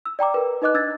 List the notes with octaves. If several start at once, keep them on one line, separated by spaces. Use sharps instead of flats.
E6
D5 G5 A#5 D6
A#4 B4
D#4 B4 D#5 D6 F#6
D4 E6 G#6 A6